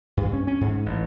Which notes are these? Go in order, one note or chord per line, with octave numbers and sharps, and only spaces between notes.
G2
C#4
C#4
G#2
A1